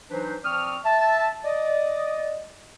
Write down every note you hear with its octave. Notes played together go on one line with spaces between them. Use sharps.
E3 F#3 D4 D#4 B4 C5
F3 C4 D5 C#6 D#6 F6
E5 A5
D5 D#5